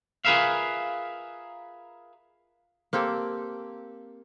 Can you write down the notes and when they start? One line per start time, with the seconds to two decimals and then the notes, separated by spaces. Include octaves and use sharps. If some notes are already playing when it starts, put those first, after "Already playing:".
0.25 F4 G#4 A#4 B4 E5 F5
2.93 A#3 C4 G4 A4